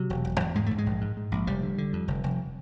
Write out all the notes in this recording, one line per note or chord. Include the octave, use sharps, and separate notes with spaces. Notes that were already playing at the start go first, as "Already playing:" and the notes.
Already playing: C3 F#3
E1
E1
E2
G#2 G#3
G#2 A3
G#3
A#1
G#2
G#2
A#1
F1 G3
D3
D3
F2
F1
F1